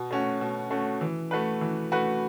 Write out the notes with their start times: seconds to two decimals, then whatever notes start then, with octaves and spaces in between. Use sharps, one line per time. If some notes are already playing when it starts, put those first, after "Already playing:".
Already playing: B2
0.11 A3 C#4 F#4
0.41 B2
0.71 A3 C#4 F#4
1.01 E3
1.31 A3 F#4 B4
1.61 E3
1.92 A3 F#4 B4